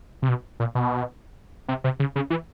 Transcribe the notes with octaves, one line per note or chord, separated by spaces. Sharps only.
C3
B2
A#2
B2
C3
C3
C#3
C#3
E3